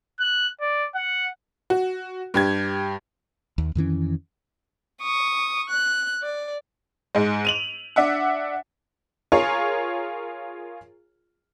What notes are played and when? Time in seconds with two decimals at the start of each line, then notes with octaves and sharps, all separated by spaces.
0.20 F#6
0.61 D5
0.95 F#5
1.70 F#4
2.34 G2 G4 G#6
3.58 D#2
3.75 F2 D#3 E3 C#4
5.02 C#6 D#6
5.70 F#6
6.23 D5
7.15 G#2 G#3
7.45 D#7 F7 F#7
7.96 D4 E5 F#5
9.32 F4 G#4 A#4 C#5